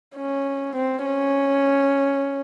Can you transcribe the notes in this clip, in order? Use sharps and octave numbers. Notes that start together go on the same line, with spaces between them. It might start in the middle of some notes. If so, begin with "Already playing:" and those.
C#4
C4
C#4